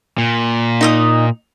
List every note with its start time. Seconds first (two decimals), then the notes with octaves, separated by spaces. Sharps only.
0.18 A#2
0.81 D#4 D#5 D#6